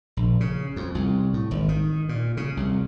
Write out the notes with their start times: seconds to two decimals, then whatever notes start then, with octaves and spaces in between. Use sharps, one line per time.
0.17 A#1
0.40 C#3
0.76 F2
0.95 C2
1.34 A2
1.51 G#1
1.69 D#3
2.09 A#2
2.37 C#3
2.57 C2